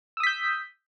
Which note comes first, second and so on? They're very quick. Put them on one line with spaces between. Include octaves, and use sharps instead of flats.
E6 D#6 B6 G6